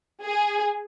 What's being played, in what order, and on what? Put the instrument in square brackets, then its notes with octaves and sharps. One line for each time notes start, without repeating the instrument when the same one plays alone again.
[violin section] G#4